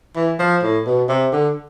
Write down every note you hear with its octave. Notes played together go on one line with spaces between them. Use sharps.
E3
F3
A2
B2
C3
D3